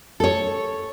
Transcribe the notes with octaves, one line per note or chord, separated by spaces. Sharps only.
A4 C#5